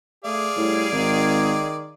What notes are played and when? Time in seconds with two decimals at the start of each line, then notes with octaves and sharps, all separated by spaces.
0.25 A3 G#4 D5 F5
0.57 A2 G3
0.92 G#1 D#3